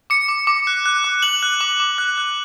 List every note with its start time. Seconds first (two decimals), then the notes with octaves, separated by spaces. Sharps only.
0.10 D6 C#7
0.29 D6
0.47 D6
0.67 F#6
0.86 F#6
1.04 D6
1.22 F#6 F#7
1.43 F#6
1.61 D6
1.80 D6
1.98 F#6
2.18 F#6